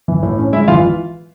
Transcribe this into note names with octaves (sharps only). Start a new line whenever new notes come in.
E3
A2
C#4
G#3 E4 E5
E3 F4 F5